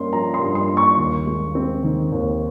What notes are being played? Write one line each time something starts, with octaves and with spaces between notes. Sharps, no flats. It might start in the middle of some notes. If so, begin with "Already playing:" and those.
Already playing: G2 A#3 C#4 C6
F3 A#5
C6
G2
C6
A#3
C#6
D#2
G#3
C4
D#3
D#2